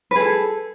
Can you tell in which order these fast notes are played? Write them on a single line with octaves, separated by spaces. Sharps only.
B4 G#4 A4